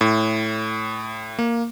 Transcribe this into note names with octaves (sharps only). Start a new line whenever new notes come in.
A2
A#3